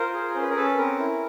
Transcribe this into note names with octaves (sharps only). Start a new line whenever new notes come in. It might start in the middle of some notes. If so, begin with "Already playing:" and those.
Already playing: F4 A#4 C5
G#4
C#4 C5
B4
A#4
C#4 A4 B4
C4 A#4
E4